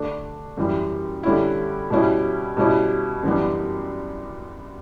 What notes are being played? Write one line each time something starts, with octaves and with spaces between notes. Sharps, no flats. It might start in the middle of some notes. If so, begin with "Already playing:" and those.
Already playing: D3 A3 D4
F#2 E3 G3
D3 G3 C#4 E4
B2 G3 C#4 E4
B2 G3 C#4 E4
F#2 E3 G3 B3 D4